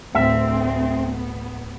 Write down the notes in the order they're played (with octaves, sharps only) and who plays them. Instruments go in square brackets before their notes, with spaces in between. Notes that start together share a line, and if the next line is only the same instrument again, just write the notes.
[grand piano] D1 [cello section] D2 C4 [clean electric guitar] E5
[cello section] B3